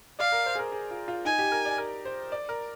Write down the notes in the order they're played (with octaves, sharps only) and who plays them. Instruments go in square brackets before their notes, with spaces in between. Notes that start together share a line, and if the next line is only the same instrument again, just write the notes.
[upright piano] D5 [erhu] F5
[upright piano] A#4
C5
G#4
A#4
G#4
F4
F4
[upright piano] D#4 [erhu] G#5
[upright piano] G4
A#4
D5
A#4
C5
D5
A#4